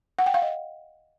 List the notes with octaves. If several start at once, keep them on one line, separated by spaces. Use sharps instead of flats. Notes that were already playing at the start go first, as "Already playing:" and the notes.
F#5
G5
F5
D#5